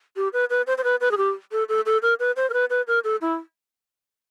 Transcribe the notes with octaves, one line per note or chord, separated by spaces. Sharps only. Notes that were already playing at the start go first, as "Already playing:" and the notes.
G4
B4
B4
C5
C5
B4
B4
G#4
G4
A4
A4
A4
A#4
B4
C5
A#4
B4
B4
A#4
A4
E4